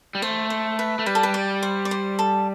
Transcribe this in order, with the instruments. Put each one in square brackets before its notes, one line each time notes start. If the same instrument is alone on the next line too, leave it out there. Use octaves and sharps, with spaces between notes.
[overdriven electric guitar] G3
[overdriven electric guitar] A3 [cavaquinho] C5
[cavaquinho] C5
B4
[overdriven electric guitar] A3
[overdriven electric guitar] G3 [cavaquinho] B4
[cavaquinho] A4
B4
D5
C5
D5
C5
A4